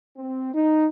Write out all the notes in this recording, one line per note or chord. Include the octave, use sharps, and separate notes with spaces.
C4
D#4